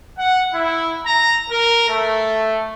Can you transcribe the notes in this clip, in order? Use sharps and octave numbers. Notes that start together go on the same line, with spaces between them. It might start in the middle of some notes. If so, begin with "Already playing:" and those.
F#5
E4
A#5
A#4
A3